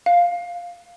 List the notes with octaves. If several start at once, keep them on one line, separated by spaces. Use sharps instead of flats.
F5